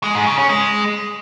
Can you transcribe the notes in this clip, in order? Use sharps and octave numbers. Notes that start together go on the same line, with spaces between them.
G#3
G#2
C#3
C#4
G#3